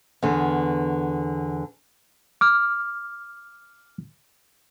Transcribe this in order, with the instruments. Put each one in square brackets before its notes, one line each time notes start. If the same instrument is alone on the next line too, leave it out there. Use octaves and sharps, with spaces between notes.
[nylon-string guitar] E2 D3 B3
[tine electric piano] D6 F6